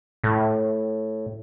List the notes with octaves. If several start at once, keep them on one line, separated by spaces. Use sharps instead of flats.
A2